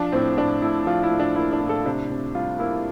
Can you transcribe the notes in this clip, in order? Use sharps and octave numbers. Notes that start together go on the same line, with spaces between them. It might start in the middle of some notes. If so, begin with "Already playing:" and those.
Already playing: F3 D4
A2 C4
A2 D4
A2 E4
F3 F4
E4
A2
D4
A#3 E4
D4
A2
A4
C3 D4
C3
G3 F4
A#3 E4